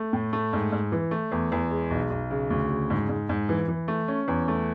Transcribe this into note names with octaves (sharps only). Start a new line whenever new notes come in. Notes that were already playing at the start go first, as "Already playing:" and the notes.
Already playing: A3
A2
A3
G#2
G#2
E3
A3
E2
E2
G#3
B1
B1
C#3
D2
C#3
G#2
G#2
G#2
E3
E3
A3
C#4
E2
A3